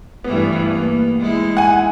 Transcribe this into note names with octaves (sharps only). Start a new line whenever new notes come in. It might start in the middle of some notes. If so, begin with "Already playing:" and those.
G2 E3 A3 B3
A#3
G#3 D#4 E4
F#5 G#5